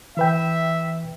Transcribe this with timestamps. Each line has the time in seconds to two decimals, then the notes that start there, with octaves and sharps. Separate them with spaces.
0.17 E3 B4 E5 G5